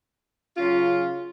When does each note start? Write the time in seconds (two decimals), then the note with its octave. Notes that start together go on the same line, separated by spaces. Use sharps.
0.57 C#3 F#3 C#4 F4